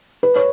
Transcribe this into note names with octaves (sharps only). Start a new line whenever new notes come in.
B4
C#5